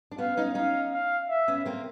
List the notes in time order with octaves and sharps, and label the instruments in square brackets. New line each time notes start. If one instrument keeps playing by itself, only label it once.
[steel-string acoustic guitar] D4
[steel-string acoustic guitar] B3 C#4 [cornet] F5
[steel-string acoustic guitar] C#4 D#4
[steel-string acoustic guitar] C#4 D#4 [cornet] F5
[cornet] F5
E5
[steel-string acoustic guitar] B3 C#4
A#3 C4